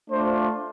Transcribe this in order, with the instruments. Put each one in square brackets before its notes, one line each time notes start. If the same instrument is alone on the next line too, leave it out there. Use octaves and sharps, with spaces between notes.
[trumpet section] A3 D4 F4 C5